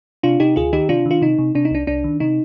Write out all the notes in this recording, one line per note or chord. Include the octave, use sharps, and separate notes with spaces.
C3 D4 F4
C3 D#4 G4
D2 F4 G#4
D#3 D#4 G4
C3 D4 F4
D#3 F4
C3 D#4
C3
C3 D4
D#4
C2 D4
C2 D4
D#3
C3 D#4